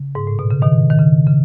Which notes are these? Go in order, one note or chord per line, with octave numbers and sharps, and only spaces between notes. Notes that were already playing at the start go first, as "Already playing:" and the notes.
Already playing: C#3
G#2
A2
B2
C#3
B2 D#3
D#3
C#3
C#3